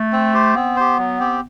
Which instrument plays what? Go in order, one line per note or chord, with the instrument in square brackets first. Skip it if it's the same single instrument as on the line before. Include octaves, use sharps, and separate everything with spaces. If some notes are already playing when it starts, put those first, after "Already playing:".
Already playing: [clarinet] A3
[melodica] C4
G4 C5
[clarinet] B3 [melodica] C4
[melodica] G4 C5
F#3
C4 G4